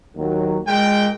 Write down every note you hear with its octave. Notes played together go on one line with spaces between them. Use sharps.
D#2 D#3 F#3
A#2 G#3 G5